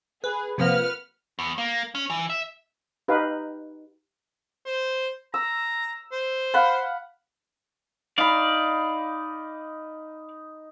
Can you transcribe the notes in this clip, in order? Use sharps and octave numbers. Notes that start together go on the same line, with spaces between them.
G#4 B4
C3 F3 A#3 B4 F#5 F6
E2
A#3
C#4
E3
E5
D#4 G4 B4 F5
C5
A#5 E6
C5
F5 F#5 B5
D#4 D5 F5 B5